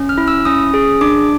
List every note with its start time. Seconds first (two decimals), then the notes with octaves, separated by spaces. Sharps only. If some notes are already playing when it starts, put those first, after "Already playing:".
Already playing: C#4
0.09 F6
0.18 E4
0.28 E6
0.45 C#4 D#6
0.74 G#4
1.01 D4 D6